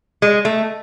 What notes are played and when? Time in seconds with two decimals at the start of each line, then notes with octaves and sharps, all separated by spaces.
0.22 G#3
0.45 A3